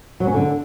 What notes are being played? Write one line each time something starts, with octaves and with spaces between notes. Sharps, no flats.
F#3
C#4
D3